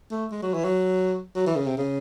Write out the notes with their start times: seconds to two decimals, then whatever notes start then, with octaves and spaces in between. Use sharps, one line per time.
0.11 A3
0.31 G#3
0.42 F#3
0.54 E3
0.64 F#3
1.35 F#3
1.47 E3
1.56 C#3
1.66 C3
1.78 C#3